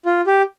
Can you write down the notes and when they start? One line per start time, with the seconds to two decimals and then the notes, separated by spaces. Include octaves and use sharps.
0.06 F4
0.27 G4